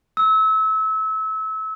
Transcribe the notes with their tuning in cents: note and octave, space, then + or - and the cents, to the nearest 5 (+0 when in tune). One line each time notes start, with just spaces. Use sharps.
E6 -30